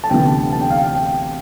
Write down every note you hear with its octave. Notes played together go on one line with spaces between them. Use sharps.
A5
D2 C3 E3 B3 G5
A5
G5
F5
G5
G5